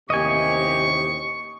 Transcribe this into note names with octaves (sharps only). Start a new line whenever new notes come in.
A1 D#2 C3 A#3 G4 D#5 G#5 C#6